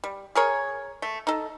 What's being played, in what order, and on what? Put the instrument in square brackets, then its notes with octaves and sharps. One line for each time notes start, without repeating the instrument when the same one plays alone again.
[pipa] G3
G#4 A#4 C#5
A3
D#4 A4